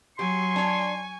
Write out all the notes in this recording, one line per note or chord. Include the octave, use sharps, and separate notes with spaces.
F#3 G4 G#5 C6 C#6
D4 C#5